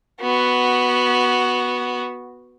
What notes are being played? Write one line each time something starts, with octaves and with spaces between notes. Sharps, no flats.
B3 F#4